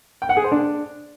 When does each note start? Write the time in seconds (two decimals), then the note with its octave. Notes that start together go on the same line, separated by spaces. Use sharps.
0.22 G5
0.29 F#5
0.37 G#4
0.44 C5
0.52 D4